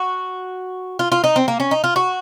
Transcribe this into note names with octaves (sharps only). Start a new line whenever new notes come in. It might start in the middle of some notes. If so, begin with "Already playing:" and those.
Already playing: F#4
F4
F4
D#4
C4
A#3
C#4
D#4
F4
F#4